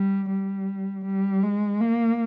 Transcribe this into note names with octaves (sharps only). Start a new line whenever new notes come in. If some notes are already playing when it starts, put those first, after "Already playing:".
Already playing: G3
G3
G3
G#3
A#3